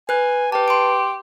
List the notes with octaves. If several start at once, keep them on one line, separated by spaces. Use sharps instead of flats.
B4 G#5 F#6
G4 B4 A5
C6 D7